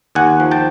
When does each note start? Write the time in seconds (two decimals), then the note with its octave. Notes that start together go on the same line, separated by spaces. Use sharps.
0.15 D#2 F#5 G#5
0.40 F3
0.51 G5 A5